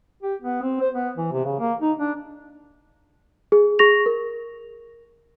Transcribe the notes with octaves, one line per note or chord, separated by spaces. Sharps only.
G4
B3
C4
C5
B3
E3
C3
C#3
A#3
D#4
D4
G#4
G#4 C#6 A#6 F7
A#4